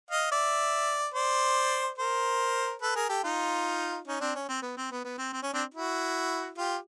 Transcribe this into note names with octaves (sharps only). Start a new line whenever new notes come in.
D#5 F5
D5 E5
C5 D5
A#4 C5
A4 B4
G#4 A#4
G4 A4
D#4 F4
C#4 D#4
C4 D4
C#4
C4
B3
C4
B3
B3
C4
C4
C#4
C4 D4
E4 F#4
F4 G4